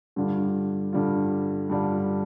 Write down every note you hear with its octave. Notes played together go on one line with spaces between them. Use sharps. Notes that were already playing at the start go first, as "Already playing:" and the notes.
G2 D3 G3 D4 F4
G2 D3 G3 D4 F4
G2 D3 G3 D4 F4